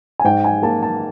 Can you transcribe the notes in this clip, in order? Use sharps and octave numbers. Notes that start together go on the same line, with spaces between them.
G#5
G#2 G5
G#5
A#3 A5
A5